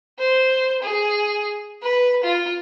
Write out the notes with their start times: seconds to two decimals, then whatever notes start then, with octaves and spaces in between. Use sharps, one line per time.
0.19 C5
0.82 G#4
1.83 B4
2.24 F4